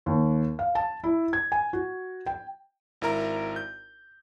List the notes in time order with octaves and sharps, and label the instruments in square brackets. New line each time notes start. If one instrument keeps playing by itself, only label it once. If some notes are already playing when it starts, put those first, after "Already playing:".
[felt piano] D#2
F5
A5
E4
G#6
G#5
F#4
G5
[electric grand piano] G#1 E4 A#4 A#5
G6